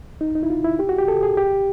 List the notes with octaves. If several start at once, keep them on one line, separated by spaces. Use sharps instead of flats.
D#4
D#4
E4
F4
E4
G4
F#4
G4
A4
G#4
G4